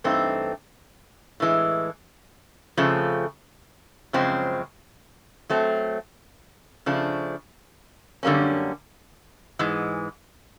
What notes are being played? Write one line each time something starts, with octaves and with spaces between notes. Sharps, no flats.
G2 E3 A3 C4 D#4
A2 E3 G#3
F2 C#3 F3 A3
F#2 C#3 F3 G#3 C4
F#3 A3 C4
C#3 F3 A3 D4
F#2 D3 G3 A#3 C#4
G#2 E3 G#3